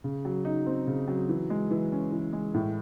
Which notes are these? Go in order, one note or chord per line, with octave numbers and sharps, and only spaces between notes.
C#3
F#3
D#4
C4
C#3
F#3
E3
G#3
E3
C#4
E3
G#3
A2